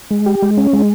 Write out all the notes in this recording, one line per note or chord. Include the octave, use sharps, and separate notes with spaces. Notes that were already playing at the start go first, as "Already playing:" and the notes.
G#3
G4
G#3
C#4
G#3